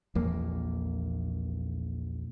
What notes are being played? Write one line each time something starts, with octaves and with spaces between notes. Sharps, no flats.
A#1 E2 A#3